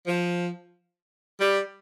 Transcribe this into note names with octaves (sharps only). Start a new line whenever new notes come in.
F3
G3